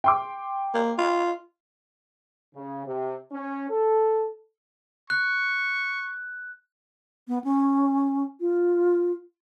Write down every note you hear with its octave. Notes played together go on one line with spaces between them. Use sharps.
G5 C6 D6
A#3
F4
C#3
C3
C#4
A4
C#6 F#6
B3
C#4
F4